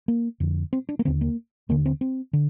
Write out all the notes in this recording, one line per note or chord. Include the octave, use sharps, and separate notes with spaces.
A#3
F2 D3
C4
D4
A#3
D#2 D3 C4
A#3
D#2 D3 A#3
C4
C4
D3